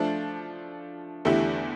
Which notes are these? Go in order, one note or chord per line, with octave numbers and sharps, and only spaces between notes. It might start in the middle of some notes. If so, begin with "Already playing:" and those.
Already playing: F3 A3 D4
E2 D3 A3 E4 G4